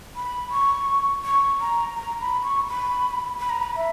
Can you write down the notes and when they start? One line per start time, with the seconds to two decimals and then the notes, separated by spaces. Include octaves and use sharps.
0.16 B5
0.51 C#6
1.25 C#6
1.61 A#5
1.95 A#5
2.21 B5
2.44 C#6
2.68 B5
3.40 B5
3.50 A#5
3.60 B5
3.76 E5